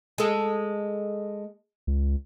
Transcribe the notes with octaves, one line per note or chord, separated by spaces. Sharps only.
G#3 A4
C#2